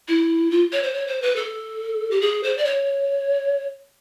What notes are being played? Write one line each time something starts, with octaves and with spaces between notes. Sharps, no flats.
E4
F4
C#5
C5
C#5
C5
B4
A4
G4
G#4
C5
D5
C#5